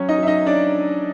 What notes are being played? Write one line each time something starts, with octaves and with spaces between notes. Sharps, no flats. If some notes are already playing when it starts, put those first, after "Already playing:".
Already playing: F#3 C#4 C#5
D#4 D#5
F#3 E5
D#4 D#5
C#4 D4 D5